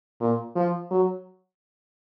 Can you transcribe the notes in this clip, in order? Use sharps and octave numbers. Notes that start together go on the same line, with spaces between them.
A#2
F3
F#3